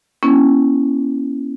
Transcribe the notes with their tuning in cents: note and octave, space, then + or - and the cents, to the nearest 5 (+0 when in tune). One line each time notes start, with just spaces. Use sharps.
A#3 +45 C#4 +0 E4 +0